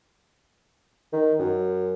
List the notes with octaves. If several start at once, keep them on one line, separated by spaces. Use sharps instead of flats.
D#3
F#2